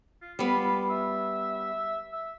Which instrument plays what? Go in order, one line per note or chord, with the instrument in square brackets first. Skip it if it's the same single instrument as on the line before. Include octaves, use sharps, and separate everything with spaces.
[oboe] F4
[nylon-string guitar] G3 B3 [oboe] F4
[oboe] E5
E5